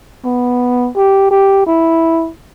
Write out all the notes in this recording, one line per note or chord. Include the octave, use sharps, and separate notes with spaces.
B3
G4
G4
E4